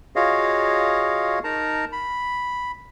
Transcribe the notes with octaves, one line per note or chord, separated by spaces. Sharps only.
F4 F#4 G#4 C#5 D#5 F5
D#4 A#4 A5 A#5
B5